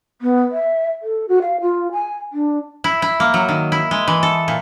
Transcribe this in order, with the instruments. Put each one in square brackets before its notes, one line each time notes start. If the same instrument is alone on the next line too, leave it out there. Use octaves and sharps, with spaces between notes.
[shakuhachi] B3
E5
A4
F#4
F5
F4
G#5
D4
[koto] E4
E4
A#3
F#3
D#3
E4
G#3
E3
A4
A#2